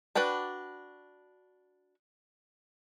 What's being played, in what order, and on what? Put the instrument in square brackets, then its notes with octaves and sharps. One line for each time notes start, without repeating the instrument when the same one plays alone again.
[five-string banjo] D4 F#4 B4 G5 A5